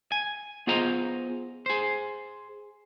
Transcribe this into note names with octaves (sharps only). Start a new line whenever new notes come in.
G#5
B3 F4 G#4 C5 D#5 A#5
G#4 C5